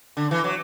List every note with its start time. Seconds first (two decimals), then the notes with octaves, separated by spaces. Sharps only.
0.17 D3
0.31 E3
0.44 F#3